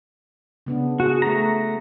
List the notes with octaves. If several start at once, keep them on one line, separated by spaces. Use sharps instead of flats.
C#3 B3 D4
F#4 G#4
A3 A#5